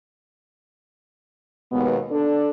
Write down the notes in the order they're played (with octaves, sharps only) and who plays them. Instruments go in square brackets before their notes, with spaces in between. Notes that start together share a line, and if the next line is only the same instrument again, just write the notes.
[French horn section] D#2 B2 G#3 B3
D4 A4